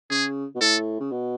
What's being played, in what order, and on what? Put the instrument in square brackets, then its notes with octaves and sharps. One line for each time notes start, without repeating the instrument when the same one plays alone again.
[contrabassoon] C#3 [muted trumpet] G#4
[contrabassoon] B2
[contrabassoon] A2 [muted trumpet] A4
[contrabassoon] C#3
B2